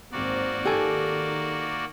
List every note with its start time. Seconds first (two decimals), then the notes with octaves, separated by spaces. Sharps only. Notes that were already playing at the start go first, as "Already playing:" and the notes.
0.12 G#1 A#3 C4 F#4 D5
0.66 D#3 G4 A4 G#5